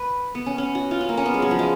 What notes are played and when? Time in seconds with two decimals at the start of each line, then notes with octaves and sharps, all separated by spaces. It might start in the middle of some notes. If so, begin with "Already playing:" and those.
Already playing: B4
0.35 B3
0.46 C#4
0.58 C#4
0.75 F#4
0.91 F4
1.01 C#4
1.09 A#3
1.17 C#4
1.26 B3
1.34 G#3
1.42 F#3
1.51 F3
1.59 G#3